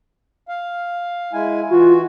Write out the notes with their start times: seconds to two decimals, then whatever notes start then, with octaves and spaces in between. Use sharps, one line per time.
0.48 F5
1.33 G#3 E4 G#5
1.70 E3 F4 F#4